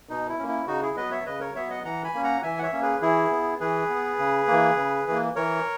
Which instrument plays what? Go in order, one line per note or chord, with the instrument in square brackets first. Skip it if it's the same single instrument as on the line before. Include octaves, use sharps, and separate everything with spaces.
[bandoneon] B2 D#4
E4
A#3 C#4
E4
C#3 D#4 F#4
E4 G#4
F#3 B3 B4 D#5
C#5 E5
C#3 B4 D#5
A#4 C#5
F#3 B3 C#5 E5
D#5 F#5
E3 F#5 A#5
G#5 B5
A#3 C#4
F#5 A#5
E3 E5 G#5
F#5
C#5 E5
A#3 C#4
G#4 B4
E3 E4 G#4
B3
E3 G#4 B4
B3
C#3
E3 A#3
C#3
E3 A#3
E3 A#4 C#5